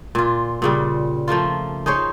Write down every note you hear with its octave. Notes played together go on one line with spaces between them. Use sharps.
A#2 F4
A#2 C#3 G3
F3 A3 A#3 F4
D#4 G#4 C5 C#5